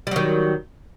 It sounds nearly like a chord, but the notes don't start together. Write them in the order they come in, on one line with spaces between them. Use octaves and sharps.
G3 F#3 D#3